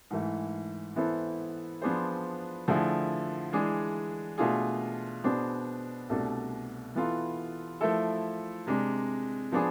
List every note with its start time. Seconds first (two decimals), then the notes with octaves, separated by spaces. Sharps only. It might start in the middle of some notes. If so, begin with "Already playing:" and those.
0.11 G#2 E3 A3 E4
0.95 E3 B3 E4 A4 C5
1.82 F3 B3 D4 G#4 C5
2.68 D3 F3 A3 E4 G#4
3.53 E3 G#3 D4 G#4
4.38 B2 A3 D4 F4 G#4
5.24 B2 B3 D4 G#4 C5
6.09 C2 B2 A3 D4 A4
6.95 E3 B3 F4 A4
7.81 F3 A3 E4 A4
8.67 C3 G#3 D4
9.52 F3 B3 D4 G#4